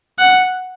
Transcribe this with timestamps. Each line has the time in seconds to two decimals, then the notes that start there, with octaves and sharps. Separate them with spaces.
0.19 F#5